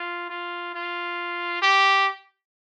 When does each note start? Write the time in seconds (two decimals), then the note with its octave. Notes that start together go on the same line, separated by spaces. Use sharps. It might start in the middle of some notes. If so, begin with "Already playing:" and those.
Already playing: F4
0.30 F4
0.75 F4
1.62 G4